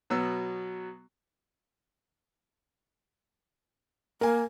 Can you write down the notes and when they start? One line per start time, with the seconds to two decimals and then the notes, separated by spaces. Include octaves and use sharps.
0.10 B2 F#3 B3 E6
4.21 A#3 A#4 G#5